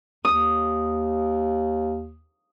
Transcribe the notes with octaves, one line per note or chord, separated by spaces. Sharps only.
D#2 D#6